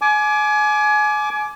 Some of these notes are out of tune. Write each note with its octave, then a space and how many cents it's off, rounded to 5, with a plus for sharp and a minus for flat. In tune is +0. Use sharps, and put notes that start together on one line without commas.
G#5 +30 D6 +0